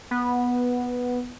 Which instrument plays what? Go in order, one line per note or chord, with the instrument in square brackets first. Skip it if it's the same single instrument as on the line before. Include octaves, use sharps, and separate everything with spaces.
[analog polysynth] B3